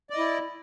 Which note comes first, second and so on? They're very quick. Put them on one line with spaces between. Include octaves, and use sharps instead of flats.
D5 D#5 E4